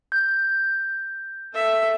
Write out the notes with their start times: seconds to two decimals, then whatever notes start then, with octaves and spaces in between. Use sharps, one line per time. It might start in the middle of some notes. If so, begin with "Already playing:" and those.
0.12 G6
1.53 A4 E5